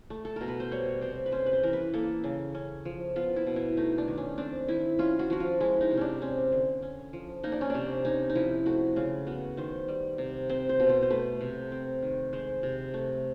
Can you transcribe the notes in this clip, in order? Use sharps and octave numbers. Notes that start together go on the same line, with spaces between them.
A3
A4
B2 A#4
B4
C5
G3 C#5
C3 C5
B4
C#4 C5
B4
C5
E3 A#4
B4
A#3 A4
C#3
C#4
F3
B3 F4
E4
B2
E4
A3 D#4
D4
D#3
C#4
C4 D4
D#3 E4
C#4 F4
F#4
F3 F#4
F4
G#3 E4
D#4
C3
C#4 D4
C4 C#4
D3
C#4
F3
A#3 D#4
D4
C#4
C3 D4
C#4 D#4
D#4
F3 E4
A3 F#4
C#3 F4
B3 F#4
D#3 C5
G3
C3
C4 C5
C5
B2
C5
C5
A3 B4
C3
C4
D#3
G#3 C5
C3
A3